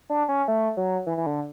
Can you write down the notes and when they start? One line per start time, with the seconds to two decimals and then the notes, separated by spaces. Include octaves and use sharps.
0.09 D4
0.29 C#4
0.48 A3
0.77 F#3
1.06 E3
1.17 E3
1.26 D3